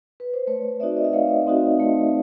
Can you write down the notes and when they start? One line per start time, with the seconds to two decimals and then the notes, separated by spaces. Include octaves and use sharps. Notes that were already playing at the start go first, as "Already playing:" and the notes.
0.20 B4
0.34 C5
0.47 A3 B4 C#5
0.80 C4 D#4 F#4 D5 E5
0.97 D#5
1.04 E5
1.13 A3 D#5 F5
1.47 C4 D#4 F#4
1.80 A3